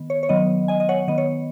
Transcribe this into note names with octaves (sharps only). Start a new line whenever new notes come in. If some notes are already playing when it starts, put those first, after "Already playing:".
Already playing: D#3 B3
C#5
C#5
D#3 F#3 B3 D#5
D#5 G#5
D#5
C#5 F#5
D#3 B3 D#5
C#5